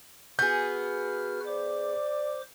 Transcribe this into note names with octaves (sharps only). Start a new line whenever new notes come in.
B3 F#4 G#4 B4 F6 G6
C5 D5 D6